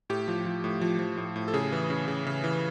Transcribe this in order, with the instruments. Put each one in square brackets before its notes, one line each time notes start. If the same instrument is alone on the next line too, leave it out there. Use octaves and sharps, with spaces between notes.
[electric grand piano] A2 G4
F3
F3
A2
F3
F3
A2
A2
A4
C#3 G#4
E3
C#3
C#3
C#3
E3